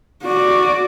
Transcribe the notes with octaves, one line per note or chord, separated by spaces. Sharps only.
F#4 D5